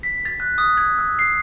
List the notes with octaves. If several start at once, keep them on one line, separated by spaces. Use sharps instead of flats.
B6
A6
F#6
D#6
G#6
E6
C7